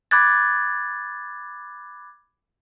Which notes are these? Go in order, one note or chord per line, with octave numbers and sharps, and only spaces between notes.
B5 D6 F#6 G#6 A6